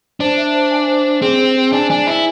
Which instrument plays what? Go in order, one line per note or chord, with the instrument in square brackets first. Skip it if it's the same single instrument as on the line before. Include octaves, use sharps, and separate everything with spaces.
[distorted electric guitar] D4 [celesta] C5
[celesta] E5
C5
G#5
C5
C5
[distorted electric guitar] C4 [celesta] G#4
[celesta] C5
G#4
[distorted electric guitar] D4 [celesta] G#5
[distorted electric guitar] D4 [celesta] G#5
[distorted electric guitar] E4 [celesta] G#5